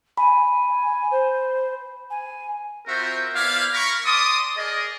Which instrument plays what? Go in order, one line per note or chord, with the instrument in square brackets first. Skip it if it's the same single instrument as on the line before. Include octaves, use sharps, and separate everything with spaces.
[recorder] G#5 [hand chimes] B5
[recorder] C5
G#5
[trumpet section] C4 F4 F#4 A#4 C5 E5
B3 E4 C5 D5 F5
A#4 B5 C#6
D5 A5 C6 D6 D#6
G#4 A#4 D5 D#5